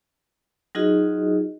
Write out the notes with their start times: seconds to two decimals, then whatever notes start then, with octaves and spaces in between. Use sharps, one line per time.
0.75 F#3 D#4 F4 F#4 G#4 D#5